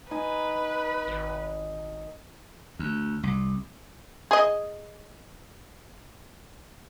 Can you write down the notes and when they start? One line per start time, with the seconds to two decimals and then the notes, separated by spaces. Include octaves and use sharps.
0.11 D#4 B4 G#5 A#5
1.07 G#1
2.79 D2
3.23 C2
4.31 G#4 D#5